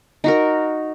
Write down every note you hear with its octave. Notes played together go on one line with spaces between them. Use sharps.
D#4 F#4 A#4